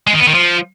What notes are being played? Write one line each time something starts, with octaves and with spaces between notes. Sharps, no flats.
G#3
D#3
B3
D#3
F3